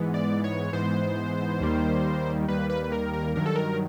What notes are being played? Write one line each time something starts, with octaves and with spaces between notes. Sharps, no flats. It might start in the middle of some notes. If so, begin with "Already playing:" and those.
Already playing: G#2 E3 G#3 B3
D5
C#5
G#2 E3 G#3 B3 C5
D#2 D#3 G3 A#3
D#2 D#3 G3 A#3 B4
B4
B4
A#4
A#4
G2 D#3 F#3 A#4
A4
A#4